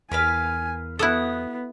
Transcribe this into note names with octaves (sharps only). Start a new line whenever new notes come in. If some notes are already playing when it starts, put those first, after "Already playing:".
E2 A#4 B4 F5 G#5
B3 E4 F#4 A4 D#6 F#6